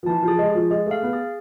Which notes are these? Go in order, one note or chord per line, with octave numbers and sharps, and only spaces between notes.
F3
E3 A5
F3
G#4
G#3
G#4
F3
G#3 G#4
A3 F5
B3
G#4